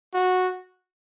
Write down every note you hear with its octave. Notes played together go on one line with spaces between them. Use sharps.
F#4